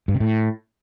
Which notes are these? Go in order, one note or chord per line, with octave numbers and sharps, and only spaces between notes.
G2
C3
A2